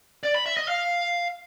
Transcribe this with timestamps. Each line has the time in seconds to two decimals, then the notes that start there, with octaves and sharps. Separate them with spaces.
0.23 D5
0.35 B5
0.46 E5
0.57 D#5
0.68 F5